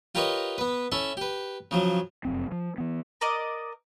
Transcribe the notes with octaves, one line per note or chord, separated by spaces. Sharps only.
F4 G4 A#4 B4 C#5 D#5
B3 B4
C#4 E4 A4
G4 B4
C#3 F3 F#3
F1 F#2 C4
F3
E3 B3
A#4 D5 D#5